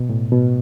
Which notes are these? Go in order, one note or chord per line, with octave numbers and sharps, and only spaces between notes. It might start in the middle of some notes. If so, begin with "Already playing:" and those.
Already playing: B2
A2
B2